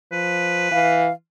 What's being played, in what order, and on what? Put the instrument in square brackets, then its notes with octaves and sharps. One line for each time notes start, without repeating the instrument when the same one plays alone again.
[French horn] F3 [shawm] B4
[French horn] E3 [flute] F5